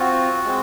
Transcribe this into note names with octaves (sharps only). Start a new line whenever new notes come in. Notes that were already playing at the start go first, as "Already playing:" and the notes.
Already playing: C4 F4 F#4
G#3 C4